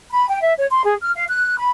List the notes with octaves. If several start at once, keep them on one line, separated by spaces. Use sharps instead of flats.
B5
G5
E5
C#5
C6
G#4
F6
F5
F#6
B5